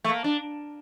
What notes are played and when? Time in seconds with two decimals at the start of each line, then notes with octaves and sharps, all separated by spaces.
0.04 A3
0.09 A#3
0.24 D4